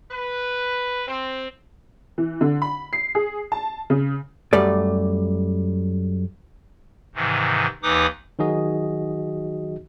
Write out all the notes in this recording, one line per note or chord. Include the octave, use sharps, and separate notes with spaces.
B4
C4
E3
D3
B5
C7
G#4
A5
C#3
F#2 G3 A3 D5
G#2 C3 D#3 E3
D#2 E3 D#4 B4 D6 D#6
D#3 F#3 D#4 F#4 G#4 D#5